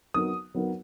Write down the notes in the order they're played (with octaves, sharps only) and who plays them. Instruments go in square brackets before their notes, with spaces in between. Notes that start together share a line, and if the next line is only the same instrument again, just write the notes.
[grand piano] F#3 B3 D#4 A#4 [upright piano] D#6
[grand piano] F#3 B3 D#4 A#4